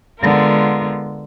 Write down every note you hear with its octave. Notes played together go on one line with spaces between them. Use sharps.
D3 G#3 B3 F4 A#4